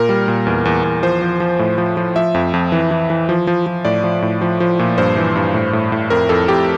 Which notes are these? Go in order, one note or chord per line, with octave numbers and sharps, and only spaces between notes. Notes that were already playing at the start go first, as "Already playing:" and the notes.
Already playing: A#2 A#4
G3
A#2
E2
E2
E2
F3 C5
F3
F3
A2
F3
F3
F3 E5
F2
F2
E3
E3
E3
F3
F3
F3
A2 D5
F3
A2
F3
F3
A#2
G2 C5
E3
G2
A2
A2
A2
F2 A#4
F2 A4
F2 G4